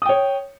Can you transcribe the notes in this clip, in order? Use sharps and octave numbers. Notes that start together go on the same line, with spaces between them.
C#5 G5 D#6